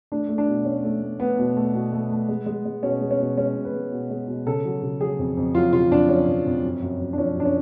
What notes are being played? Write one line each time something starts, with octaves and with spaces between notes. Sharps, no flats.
A3 D4
A3
D4
B2
A3 C#4
A3
A3
A3 B3
B2
A3
B2
A3
A3
G#3
G#3
G#3
B2 C#4
G#3
C#4
B2
G#3 C#4
B2
B4
G#3
B2
G#3
B2
C#3 A4
F#3
C#3
F#3 G#4
F2
F2
F#3 F4
C#3 F4
F2 D4
F#3 C#4
F2
F2
F#2
F#2
F#2
D4
F3 C#4
F#2 D4
C#4